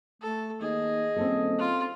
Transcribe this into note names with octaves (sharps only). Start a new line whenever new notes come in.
A3 A4
D#2 G#4 D#5
D#1 C4 C#4 A4
F4